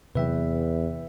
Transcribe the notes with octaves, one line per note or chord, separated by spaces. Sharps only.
E2 C3 F#3 B4 E5 G5